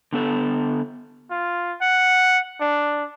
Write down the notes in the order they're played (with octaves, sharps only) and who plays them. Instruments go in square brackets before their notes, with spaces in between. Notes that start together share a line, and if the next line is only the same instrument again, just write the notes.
[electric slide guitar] D3 B3 A4
[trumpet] F4
F#5
D4